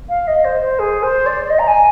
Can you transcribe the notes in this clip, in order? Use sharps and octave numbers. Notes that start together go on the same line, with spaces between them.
F5
D#5
C5
C5
G#4
C5
D5
D5
D#5
A#5
G#5